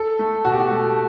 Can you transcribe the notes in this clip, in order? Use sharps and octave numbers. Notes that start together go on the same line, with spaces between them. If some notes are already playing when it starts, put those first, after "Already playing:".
Already playing: A4
A3
B2 F#4
G4
F#4
A3